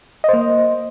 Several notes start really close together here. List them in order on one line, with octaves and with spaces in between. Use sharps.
D#5 C5 A#3